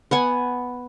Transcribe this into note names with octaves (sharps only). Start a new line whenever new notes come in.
B3 F#5 G#5